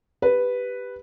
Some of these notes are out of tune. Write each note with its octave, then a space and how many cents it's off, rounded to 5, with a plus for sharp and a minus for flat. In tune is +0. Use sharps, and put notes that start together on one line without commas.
G4 +0 B4 +0